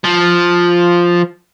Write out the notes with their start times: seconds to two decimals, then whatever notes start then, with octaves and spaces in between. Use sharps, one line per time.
0.04 F3